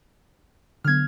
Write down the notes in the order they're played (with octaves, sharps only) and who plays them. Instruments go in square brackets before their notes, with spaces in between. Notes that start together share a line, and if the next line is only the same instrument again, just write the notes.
[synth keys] D3 F#3 B3 [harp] F6 G#6